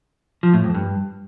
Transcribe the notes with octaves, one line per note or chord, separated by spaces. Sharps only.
F3
A2
F2
G2